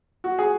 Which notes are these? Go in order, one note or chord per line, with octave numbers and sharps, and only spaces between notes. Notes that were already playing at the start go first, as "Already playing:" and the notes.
F#4
G#4